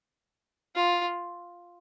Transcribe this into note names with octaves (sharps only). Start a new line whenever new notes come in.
F4